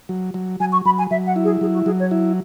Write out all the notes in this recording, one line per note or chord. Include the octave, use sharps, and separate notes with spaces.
F#3
F#3
F#3 G#5
C#6
F#3 B5
G#5
F#3 E5
F#5
E4
G#4
F#3 G#4
F#4
F#3 G#4
C#5
E4